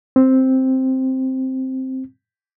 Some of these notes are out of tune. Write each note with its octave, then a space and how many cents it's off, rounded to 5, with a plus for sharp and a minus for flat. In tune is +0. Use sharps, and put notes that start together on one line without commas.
C4 +0